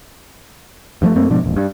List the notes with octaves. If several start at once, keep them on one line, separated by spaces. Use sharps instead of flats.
G2 F3 G3 A3
F#2 A3 A#3 C4
G#2 B2 F3 D4
E1 A#1
G2